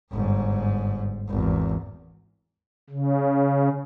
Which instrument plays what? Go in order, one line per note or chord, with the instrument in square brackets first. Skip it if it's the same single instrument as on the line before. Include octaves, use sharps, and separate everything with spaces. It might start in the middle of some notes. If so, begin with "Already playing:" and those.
[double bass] G1 G#2
G#1 E2
[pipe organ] C#3